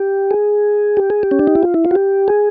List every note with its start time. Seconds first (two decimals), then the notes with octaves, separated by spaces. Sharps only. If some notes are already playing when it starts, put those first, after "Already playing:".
Already playing: G4
0.31 G#4
0.97 G4
1.10 G#4
1.23 G4
1.31 C#4
1.39 D4
1.47 D#4
1.55 E4
1.63 F4
1.74 E4
1.85 F4
1.91 F#4
1.95 G4
2.28 G#4